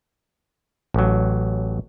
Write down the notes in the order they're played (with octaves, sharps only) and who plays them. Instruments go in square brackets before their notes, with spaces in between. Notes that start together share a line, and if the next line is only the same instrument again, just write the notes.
[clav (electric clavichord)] A1 F#3